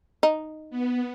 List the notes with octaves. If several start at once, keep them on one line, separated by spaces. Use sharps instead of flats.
D#4
B3